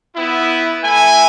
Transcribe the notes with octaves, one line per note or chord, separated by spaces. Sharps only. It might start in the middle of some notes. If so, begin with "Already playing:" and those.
B3 E4
A3 E4 G#5